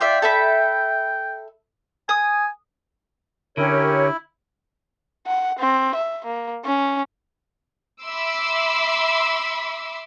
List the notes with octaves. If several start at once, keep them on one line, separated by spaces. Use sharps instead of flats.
F4 D5 E5 G5
A4 E5 B5
G#5 D#6
D3 C#4 E4 G4 A#4 C#5
F#5
C4
E5
A#3
C#4
E5 B5 C6 D6 E6